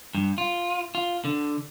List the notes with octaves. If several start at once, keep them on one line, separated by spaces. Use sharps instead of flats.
G2
F4
F4
D3